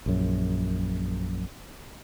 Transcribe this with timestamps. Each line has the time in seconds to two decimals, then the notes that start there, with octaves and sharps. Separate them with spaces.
0.06 A#1 F#2